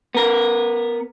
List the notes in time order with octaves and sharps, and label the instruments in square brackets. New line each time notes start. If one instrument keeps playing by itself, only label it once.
[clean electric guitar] B3 A#4